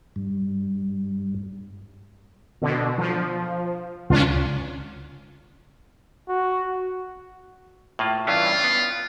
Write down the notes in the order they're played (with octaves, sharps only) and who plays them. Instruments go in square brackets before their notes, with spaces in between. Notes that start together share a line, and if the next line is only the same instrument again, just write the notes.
[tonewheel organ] G2
[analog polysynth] B2 D3
F3
[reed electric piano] C#2 [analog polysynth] C#4 D4 F4
[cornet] F#4
[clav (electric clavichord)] A2 A#3 F4
[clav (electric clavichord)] G2 E3 C#4 [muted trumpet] F4
[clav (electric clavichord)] B3